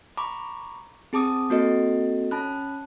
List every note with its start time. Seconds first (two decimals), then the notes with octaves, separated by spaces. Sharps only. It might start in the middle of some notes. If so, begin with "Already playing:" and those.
0.17 A#5 B5 C#6 D6
1.13 C4 G#4 A5 D6 D#6
1.50 A#3 C4 F#4 A4 D#5
2.31 C#4 A5 B5 F#6